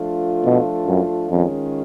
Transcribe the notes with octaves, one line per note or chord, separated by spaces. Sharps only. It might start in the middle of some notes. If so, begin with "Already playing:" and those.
Already playing: F3 A3 D4 F4
B2
F#2
F2 D#3 G#3 C#4 F4